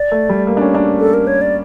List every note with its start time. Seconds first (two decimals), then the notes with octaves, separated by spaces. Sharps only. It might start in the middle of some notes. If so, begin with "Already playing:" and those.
Already playing: D5
0.12 A3
0.29 G3
0.47 A#3
0.57 D4
0.61 C#4
0.75 D4
1.00 A4
1.14 A#4
1.27 C#5
1.41 D5